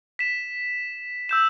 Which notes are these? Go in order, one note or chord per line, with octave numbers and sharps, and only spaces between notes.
B6 E7
E6 G6 E7